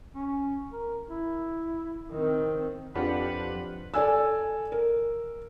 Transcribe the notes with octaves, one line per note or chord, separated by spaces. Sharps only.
C#4
A#4
E4
D#3 C4
F2 D4 F4 G4 B4 F#5
A4 D5 G#5 E6
A#4